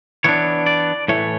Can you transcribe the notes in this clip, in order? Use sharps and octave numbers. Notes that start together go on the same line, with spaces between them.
E3 B3 D4 C#5
D5
A2 E3 A3 C#5